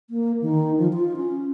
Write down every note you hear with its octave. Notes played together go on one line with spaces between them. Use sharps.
A#3
D#3
F3
F4
C#4